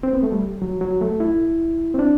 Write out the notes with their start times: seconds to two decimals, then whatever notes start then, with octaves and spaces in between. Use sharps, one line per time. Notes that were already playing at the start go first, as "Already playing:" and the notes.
0.03 C4
0.13 B3
0.23 A3
0.32 G3
0.62 F#3
0.81 F#3
1.01 A3
1.20 E4
1.94 C4
1.99 D4